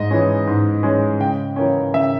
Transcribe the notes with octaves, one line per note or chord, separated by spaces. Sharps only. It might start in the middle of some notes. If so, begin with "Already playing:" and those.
Already playing: G#2 D#5
E3 G#3 C#4
G#2
E3 G#3 C#4
C#3 G5
E3 A#3 C#4
C#3 E5